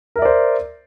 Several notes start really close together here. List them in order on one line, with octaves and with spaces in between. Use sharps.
A#4 E5 D5 C5